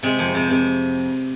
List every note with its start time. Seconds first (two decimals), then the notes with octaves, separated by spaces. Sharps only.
0.03 C3 G#3
0.19 F2
0.34 C3
0.50 C3